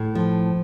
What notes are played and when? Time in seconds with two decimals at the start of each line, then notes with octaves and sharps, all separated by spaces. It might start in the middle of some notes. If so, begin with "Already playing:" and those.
Already playing: A2
0.15 F3